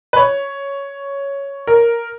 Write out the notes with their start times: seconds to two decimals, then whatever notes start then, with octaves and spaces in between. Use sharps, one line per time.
0.13 B4
0.17 C#5
1.67 A#4